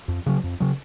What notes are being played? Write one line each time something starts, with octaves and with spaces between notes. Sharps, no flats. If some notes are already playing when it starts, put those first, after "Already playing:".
F2
C#3 F#3
F2
C#3 F#3